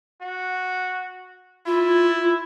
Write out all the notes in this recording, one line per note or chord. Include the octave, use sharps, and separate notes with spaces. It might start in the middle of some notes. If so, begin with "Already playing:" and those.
F#4
E4 F4